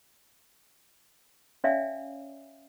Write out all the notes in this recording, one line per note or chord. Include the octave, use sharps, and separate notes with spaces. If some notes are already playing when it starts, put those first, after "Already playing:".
C#4 C#5 D5 E5 F5 G#5